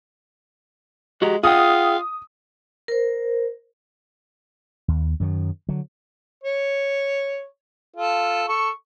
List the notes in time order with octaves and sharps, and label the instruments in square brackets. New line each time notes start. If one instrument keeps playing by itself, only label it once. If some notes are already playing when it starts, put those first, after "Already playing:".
[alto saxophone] G#3 [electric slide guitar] F#4 G4 A#5
[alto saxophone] F4 [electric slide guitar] G#4 F#5 G5 [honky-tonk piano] D#6
[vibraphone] A#4 C5
[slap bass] D#2
F#2 D#3 F#3
D3 F#3
[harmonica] C#5
F4 A4
A4 C#6